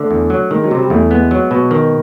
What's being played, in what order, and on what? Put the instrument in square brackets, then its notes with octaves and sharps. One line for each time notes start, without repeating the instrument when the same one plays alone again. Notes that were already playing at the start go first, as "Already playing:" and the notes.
Already playing: [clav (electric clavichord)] D3 [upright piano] A3
[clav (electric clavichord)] E2
F#3
[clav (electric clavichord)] D#3 [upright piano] G#3
[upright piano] F#3
[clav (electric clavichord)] C3
[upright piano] G3
[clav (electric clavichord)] E2 [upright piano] A3
[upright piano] G#3 [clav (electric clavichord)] B3
[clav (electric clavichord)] F#3
B2
D#3